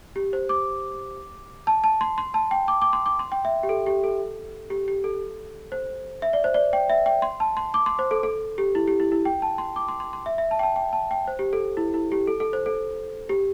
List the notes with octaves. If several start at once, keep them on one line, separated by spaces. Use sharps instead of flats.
G4
C5
D6
A5
A5
C6
C6
A5
G5
D6
D6
C6
D6
C6
G5
E5
G4
A4
G4
A4
G4
G4
A4
C5
E5
D5
C5
D5
G5
E5
G5
C6
A5
C6
D6
C6
C5
A4
A4
G4
E4
G4
E4
E4
G5
A5
C6
D6
C6
C6
C6
E5
E5
A5
G5
A5
G5
A5
G5
C5
G4
A4
E4
E4
G4
A4
A4
C5
A4
G4